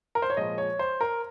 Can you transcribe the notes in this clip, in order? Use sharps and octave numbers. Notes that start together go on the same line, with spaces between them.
A#4
C5
C#5
A#2 F3 G#3 D#5
C#5
C5
A#4